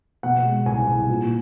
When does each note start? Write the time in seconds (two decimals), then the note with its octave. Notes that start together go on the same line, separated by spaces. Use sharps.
0.23 B2 F#5
0.45 G#3
0.66 C2 G#5
0.87 C2
1.09 A#2